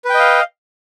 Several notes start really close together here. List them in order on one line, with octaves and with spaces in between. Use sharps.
B4 G5 D#5 F5